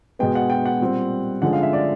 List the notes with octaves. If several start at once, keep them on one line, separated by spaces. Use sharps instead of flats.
B2 G#3 B3 G5
F#5
G5
F#5
A#2 G3 C4
D3 F3 G#3 C#4 F#5
F5
E5
D5